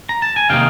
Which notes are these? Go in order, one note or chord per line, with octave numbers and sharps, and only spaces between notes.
A#5
A5
G#5
C3 D#3 A#3 D#4 F5 G5